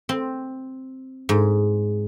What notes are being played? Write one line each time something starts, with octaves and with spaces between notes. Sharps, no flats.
C4
G#2